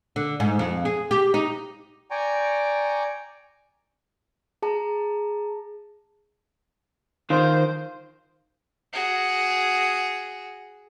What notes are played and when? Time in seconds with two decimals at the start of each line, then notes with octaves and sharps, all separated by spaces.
0.16 D3
0.40 G#2
0.59 F2
0.85 G#4
1.11 G4
1.34 D#4
2.11 D5 G5 G#5 A#5 C#6
4.62 G#4 A5 A#5
7.30 D#3 F4 C5
8.93 F#4 G#4